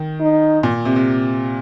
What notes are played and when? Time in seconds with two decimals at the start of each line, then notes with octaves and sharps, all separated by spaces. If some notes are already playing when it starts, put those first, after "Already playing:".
Already playing: D#3
0.21 D#4
0.63 A#2
0.85 C3
0.96 C3